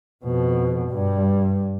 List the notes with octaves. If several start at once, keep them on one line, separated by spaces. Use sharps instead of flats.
F2 B2
G2 G3